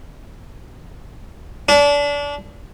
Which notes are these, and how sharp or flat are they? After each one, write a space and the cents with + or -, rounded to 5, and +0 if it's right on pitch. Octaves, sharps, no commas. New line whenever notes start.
D4 -30